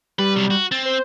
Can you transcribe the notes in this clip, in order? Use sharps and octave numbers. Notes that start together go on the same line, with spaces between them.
G3 B4
C3 F#3
F#4
C4 A6
C5